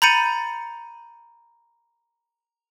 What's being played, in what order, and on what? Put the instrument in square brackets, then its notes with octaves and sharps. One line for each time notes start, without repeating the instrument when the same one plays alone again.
[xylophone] A#5 B5 G6 A6 C#7 D#7